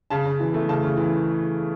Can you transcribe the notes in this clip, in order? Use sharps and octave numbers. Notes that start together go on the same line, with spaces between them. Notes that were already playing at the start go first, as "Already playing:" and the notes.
C#3 A5
C#3
E3
A3
C#3 A5
C#3
E3